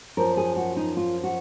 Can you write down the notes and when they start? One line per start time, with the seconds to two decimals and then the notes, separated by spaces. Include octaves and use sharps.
0.17 F#2 F3 A#3 A#4
0.37 G#4
0.56 F#4
0.77 D#4
0.97 F4
1.23 F#4